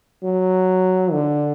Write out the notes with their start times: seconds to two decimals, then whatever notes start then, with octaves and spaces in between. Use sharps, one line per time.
0.23 F#3
1.12 D3